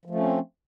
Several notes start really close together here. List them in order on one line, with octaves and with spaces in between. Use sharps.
F3 A3 C#4 C4